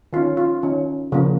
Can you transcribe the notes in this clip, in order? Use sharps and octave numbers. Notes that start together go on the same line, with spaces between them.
D#3 C#4 F4
F4
D#3 C#4
C#3 F3 A#3